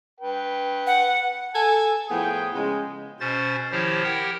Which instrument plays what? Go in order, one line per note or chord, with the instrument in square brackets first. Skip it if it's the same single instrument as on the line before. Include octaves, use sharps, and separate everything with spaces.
[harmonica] B4 G5
[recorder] F#5
[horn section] A4 G#5
A2 F3 B3 G#4 G5
C#3 G#3
[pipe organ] B2 C#4 C5 A6
D#3 F3 E4 G4 C5 C#5
G4 A#4 F#5 G5